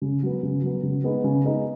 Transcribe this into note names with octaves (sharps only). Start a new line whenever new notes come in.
C#3
F#3 B3
C#3
F#3 B3
C#3
G#3 B3 D#4
C#3
G#3 B3 D#4